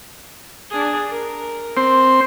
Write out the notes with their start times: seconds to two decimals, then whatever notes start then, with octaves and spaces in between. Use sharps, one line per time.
0.70 D4 G#4
1.11 A#4
1.77 C4 C5